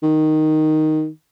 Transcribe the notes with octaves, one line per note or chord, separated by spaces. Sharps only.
D#3